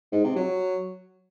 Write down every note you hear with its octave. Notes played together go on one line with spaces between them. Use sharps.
G#2
C3
F#3